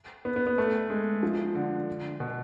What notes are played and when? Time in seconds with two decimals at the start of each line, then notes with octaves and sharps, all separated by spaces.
0.25 B3
0.36 B3
0.47 B3
0.58 A3
0.90 G#3
1.23 F3
1.55 D3
2.20 B2